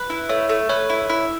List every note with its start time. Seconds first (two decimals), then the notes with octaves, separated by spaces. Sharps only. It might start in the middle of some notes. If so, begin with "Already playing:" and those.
Already playing: B4
0.10 E4
0.29 A3 C#5
0.49 A3
0.69 B4 C#5
0.90 E4
1.10 E4